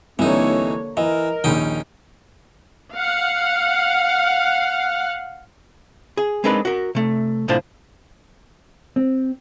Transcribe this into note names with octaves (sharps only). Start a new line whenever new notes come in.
C2 D3 E3 A#3 D#4 C#5
E3 A#4 D#5
A#1 D#2 C#4 D#4 G5
F5 F#5
G#4
G#3 C4 D4 D#4 A#4 B4
F#4 A#4
C3 A3
C2 A2 D3 F4 C5 A5
C4